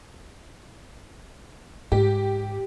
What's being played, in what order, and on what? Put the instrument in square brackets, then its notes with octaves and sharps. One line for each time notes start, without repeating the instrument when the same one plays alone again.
[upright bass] G#2 [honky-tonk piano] G4